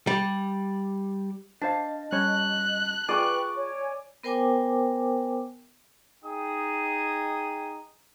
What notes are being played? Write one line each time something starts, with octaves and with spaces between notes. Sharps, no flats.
G3
D4 C5 D#5 F5 A5
G3 C#4 C#5 F#6
F4 G#4 B4 D5 G5 C#6 D6
C#5 G#5
B3 A#4 C5 G5 G#5 D6
D#4 G#4 G5 D#6